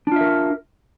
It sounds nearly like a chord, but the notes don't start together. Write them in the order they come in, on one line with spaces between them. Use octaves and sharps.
D4 F4 E5 A#4